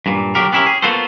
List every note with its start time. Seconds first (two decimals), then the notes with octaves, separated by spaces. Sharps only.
0.06 G2 A#2
0.35 D3 F#3 G4 A#4
0.53 B3 C#4 E4 G4 A#4
0.66 G#4
0.82 A#3 B3 F4 F#4 A4 C5